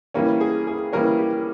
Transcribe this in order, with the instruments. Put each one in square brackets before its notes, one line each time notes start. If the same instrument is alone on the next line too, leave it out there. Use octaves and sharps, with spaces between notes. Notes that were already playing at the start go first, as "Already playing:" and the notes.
[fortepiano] E3 G3 A#3 C#4
G#4
G#4
E3 G3 A#3 C#4 A#4
G4